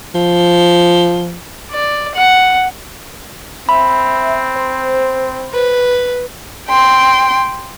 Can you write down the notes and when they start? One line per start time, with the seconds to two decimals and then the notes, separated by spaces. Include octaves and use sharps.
0.15 F3
1.71 D5
2.15 F#5
3.69 C4 E5 B5
4.56 C5
5.53 B4
6.69 G5 C6